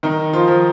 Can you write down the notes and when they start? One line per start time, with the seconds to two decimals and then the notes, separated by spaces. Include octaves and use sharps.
0.03 D#3 D#4
0.33 F3 F4
0.47 F3